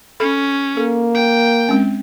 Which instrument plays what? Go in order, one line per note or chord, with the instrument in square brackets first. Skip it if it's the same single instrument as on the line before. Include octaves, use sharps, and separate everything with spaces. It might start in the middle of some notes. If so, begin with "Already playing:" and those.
[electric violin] C#4 [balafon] A4 B5
[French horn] A#3 [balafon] A4
[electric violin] G5
[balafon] G#3 C4 C#4